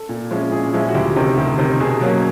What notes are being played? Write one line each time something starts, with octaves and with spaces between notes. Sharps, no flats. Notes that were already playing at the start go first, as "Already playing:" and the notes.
Already playing: A4
A#2
F3 G#3 C#4 E4
A#2 G#4
F3 G#3 C#4 E4
F#4
D2 G4
C3 D#3 G4
D2 G4
C3 D#3
B2 G#4
F#3 A#3 C#4